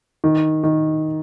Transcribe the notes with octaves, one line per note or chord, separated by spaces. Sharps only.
D#3
D#3